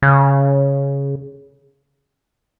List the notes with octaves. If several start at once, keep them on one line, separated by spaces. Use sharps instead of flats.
C#3